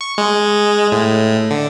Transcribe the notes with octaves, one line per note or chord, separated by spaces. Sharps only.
C#6
G#3
A2
D3